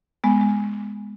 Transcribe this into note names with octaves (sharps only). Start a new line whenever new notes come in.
G#3 B3
G#3